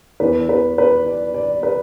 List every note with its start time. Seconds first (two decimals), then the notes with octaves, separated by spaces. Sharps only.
0.20 E2 E3 B4
0.49 B4
0.78 B4
1.06 D5
1.34 D5
1.63 B4